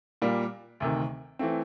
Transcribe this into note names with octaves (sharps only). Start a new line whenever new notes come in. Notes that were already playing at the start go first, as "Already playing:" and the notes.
A#2 G3 A#3
D2 C3 D#3
E3 A3 C4